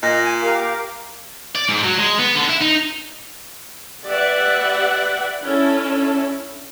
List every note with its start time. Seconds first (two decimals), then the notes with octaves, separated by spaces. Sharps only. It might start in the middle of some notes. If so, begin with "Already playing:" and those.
0.02 A#2 D#5
0.23 G#5
0.41 G4 A#4 F5 D6
0.56 F5
1.55 D5
1.69 G#2
1.84 F#3
1.99 G#3
2.19 B3
2.36 D3
2.49 E4
2.61 D#4
4.05 G4 B4 D5 E5 F#5
5.44 C#4 D4 E4 A4